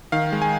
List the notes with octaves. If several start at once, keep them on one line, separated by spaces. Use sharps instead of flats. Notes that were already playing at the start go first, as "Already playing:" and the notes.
D#3 F5
G#3
G#5